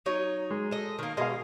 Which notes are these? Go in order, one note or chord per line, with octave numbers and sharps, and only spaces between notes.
F#3 D#4 C#5
G#3
A4 D#5
D#3 A#3
B2 G#3 D#5 F5